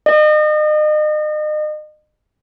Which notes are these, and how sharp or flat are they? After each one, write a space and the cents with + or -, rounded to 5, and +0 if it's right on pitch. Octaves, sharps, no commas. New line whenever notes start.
D#5 -35